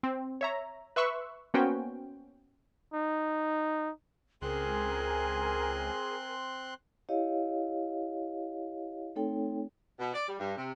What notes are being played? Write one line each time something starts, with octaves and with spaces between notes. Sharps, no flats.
C4
C#5 E5 A#5
B4 E5 C6 C#6 E6 F#6
A#3 B3 C#4 F#4 C5 G5
D#4
C#2 C4 G#4 A#4 G#5 C6 F#6
E4 G4 C#5 D#5 F5
A3 C4 D#4 A4 C#5 G5
B2
D5
G3
G2
C3